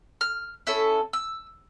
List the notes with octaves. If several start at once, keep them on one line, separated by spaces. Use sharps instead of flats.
F6
C#4 E4 A4 E6
E6